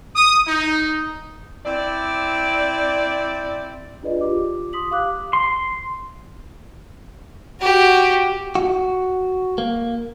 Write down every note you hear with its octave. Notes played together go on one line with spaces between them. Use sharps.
D#6
D#4
C4 E4 D5
D4 F4 G#4 B4 D5 D#5
F4 G4 D6
C6 D#6 B6 F#7
G4 F5 D6 F#6
C6
F#4 G4
F#4
A#3